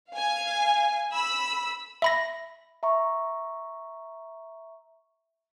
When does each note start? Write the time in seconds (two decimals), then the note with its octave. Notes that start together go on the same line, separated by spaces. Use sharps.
0.10 F5 G#5
1.12 B5 E6
2.02 E5 B5 A#6
2.83 E5 A#5 C#6